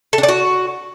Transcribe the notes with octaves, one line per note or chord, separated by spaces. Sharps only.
A4
D4
D5
F#4